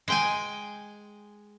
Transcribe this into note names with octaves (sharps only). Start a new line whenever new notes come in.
G#3 G5 G#5